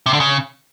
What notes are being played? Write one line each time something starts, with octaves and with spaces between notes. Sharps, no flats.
C3
D3
C#3